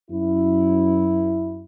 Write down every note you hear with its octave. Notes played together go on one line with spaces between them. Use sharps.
F#2 E4